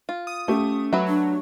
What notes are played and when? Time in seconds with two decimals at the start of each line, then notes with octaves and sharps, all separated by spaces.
0.09 F4
0.27 D#6
0.48 A3 C#4 G4
0.93 F#3 B4 E5
1.08 D4